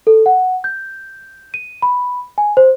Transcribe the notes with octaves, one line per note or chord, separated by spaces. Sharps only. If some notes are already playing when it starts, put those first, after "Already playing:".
A4
F#5
G6
D#7
B5
G#5
C5